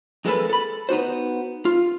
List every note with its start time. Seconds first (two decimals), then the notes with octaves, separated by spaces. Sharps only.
0.25 F2 G#3 A#3 C4 A4 B4
0.50 A4 B5
0.89 B3 D#4 F#4 C5
1.65 F4